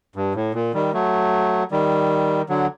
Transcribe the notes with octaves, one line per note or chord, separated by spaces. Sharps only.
G2
A2
A#2
D#3 G3
F#3 A3
D#3 G3
D3 F#3